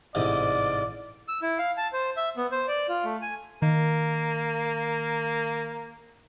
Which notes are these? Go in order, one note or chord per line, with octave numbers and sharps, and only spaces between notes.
A1 G#2 C3 D5
E6
E4
F5
A5
C5
E5
B3
C5
D5
F4
A3
G#5
D#3 A#3